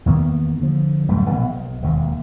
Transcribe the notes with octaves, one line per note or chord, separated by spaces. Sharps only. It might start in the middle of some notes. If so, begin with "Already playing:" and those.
E2 D#3 A#3 B3
D3 F3
D1 F#2 G3 A3
A#1 D#2 B2
B1
E1 D#2